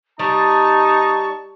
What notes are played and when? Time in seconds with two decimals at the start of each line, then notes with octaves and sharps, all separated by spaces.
0.19 G3 D#4 A5 C#6